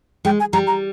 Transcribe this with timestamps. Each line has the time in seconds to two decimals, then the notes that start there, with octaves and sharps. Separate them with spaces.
0.25 G#3 G5
0.40 G#5
0.53 G3 A#5
0.67 A#5